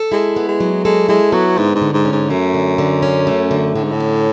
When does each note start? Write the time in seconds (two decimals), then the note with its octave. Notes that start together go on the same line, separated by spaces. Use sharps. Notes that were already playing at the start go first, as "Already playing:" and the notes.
Already playing: A4
0.12 G#3 E4
0.36 B3
0.48 G#3
0.60 F#3
0.85 G#3 A4
1.08 G#3 E4
1.32 F#3 B3
1.58 G#2 D3
1.75 G#2
1.82 D3
1.93 G#2
2.05 C#4
2.12 G#2
2.30 F#2 A3
2.54 D3
2.78 D3
3.03 C#4
3.27 A3
3.51 D3
3.75 A2 D3
3.84 G#2
3.92 A2
4.00 C#4